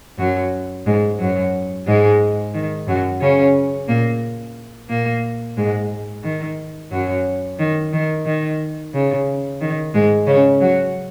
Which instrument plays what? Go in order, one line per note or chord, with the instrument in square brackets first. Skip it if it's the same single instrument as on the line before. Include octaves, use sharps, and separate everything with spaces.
[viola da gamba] F#2 F#3
G#2 G#3
F#2 F#3
G#2 G#3
D#3
F#2 F#3
C#3 C#4
A#2 A#3
A#2 A#3
G#2 G#3
D#3
F#2 F#3
D#3
D#3
D#3
C#3
D#3
G#2 G#3
C#3 C#4
F#3 F#4